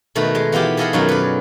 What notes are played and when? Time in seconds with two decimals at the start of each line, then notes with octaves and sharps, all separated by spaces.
0.15 B2 D#3 A3 B4
0.35 G#3
0.52 E3 B3 F4 G4
0.77 G#4 A4 D#5 F5 F#5 B5
0.93 F#2 B2 D#3 F#3 F4
1.09 B4 D5